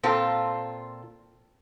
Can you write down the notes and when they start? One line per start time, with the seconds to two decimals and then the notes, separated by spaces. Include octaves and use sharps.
0.03 A#2 C4 F4 A4